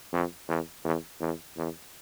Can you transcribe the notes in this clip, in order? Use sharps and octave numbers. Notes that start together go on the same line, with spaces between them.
F2
E2
E2
E2
E2